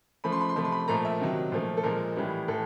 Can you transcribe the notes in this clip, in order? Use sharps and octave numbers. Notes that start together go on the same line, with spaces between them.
C#3 F3 A3 B5
C6
B5
C6
C3 F3 A3 B5
C6
B5
A#2 F3 A3 A#5
E5
C3 D#3 F#3
A#2 F3 A3
A4
A#2 F3 G#3 A#4
A2 E3 G3
A2 E3 A4